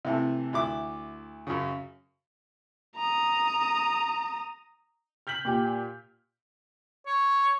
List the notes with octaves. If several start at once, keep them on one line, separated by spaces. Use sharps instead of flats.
C3 E3 A3
D2 E4 D6
F#2 C#3
A#5 D#6
F6 G6 B6 F#7
A#2 G4
C#5